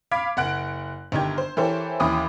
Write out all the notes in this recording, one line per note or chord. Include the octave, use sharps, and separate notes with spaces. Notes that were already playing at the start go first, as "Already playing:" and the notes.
F5 B5 D6 G#6 B6 D7
F#1 F#5 F#6 D7
G1 D#3 D#4 G4 G#6
C5
E3 G4 A4 A#4 C5 C#5
D#2 E3 C#4 B5 D6 D#6